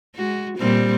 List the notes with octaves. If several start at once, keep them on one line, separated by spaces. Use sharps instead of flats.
G#3 F#4
A#2 G3 C4